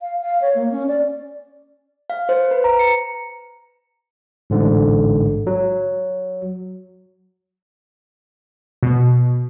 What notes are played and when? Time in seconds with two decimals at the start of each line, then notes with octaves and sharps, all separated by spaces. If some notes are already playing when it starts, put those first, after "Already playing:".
0.01 F5
0.21 F5
0.42 C#5
0.55 A#3
0.72 C#4
0.88 D5
2.10 F5
2.29 C5
2.51 B4
2.64 A#5
2.79 C#7
4.50 A1 G#2 D3
5.47 F#3
8.83 B2